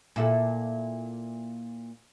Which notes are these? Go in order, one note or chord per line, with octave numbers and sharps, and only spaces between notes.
A#2 E4 A4